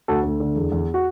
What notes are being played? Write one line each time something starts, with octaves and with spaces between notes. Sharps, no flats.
D2 F#4 A4
D2
D3
E2
E2
F#4